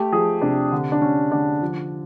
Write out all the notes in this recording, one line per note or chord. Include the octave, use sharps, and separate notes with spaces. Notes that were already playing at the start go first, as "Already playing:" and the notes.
Already playing: A3 G4
F3 G#4
C3 D4
D3
D4
D3 C#4
D3 D4
F3